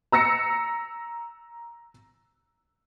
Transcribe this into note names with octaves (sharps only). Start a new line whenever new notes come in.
A#5 E6 A#6 C#7